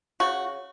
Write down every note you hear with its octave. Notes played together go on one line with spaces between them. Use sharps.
C#3 F#4